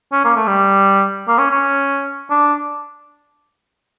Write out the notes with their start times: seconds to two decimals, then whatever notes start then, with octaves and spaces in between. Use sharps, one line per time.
0.12 C#4
0.24 A#3
0.36 A3
0.47 G3
1.28 A#3
1.38 C#4
1.51 C#4
2.30 D4